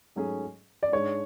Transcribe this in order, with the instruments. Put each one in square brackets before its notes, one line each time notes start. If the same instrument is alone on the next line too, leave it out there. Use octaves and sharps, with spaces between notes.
[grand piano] G#2 F#3 A3 C#4 G#4
[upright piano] D5
[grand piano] G#2 G#3 D4 [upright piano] C#5